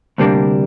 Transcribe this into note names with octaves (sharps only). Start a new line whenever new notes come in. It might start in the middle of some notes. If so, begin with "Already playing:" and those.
D2 C3 G3 A#3 D4